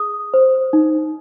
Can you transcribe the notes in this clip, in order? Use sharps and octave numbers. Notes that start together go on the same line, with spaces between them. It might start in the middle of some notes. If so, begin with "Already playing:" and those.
Already playing: G#4 D#6
C5
D#4